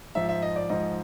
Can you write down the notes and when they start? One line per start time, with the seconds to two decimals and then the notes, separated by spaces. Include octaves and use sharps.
0.15 G#2 F3 E5
0.29 E5
0.42 D#5
0.56 D5
0.69 G#2 F3 D#5